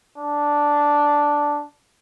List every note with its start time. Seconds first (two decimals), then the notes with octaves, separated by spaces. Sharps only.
0.18 D4